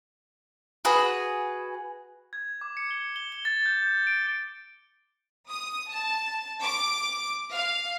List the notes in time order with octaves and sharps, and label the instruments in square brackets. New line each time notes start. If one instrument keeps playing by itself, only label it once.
[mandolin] F#4 G#4 B4
[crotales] G#6
D6
C#7
G7
G7
G7
A6
G6
G6
D7
[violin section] D#6
A5
D6
F5